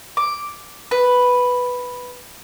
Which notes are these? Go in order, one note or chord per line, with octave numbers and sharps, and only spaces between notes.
D6
B4